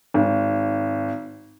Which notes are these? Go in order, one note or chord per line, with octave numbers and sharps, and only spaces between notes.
G#1